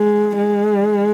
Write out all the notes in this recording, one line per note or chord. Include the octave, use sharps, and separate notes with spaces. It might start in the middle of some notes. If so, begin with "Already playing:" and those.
Already playing: G#3
G#3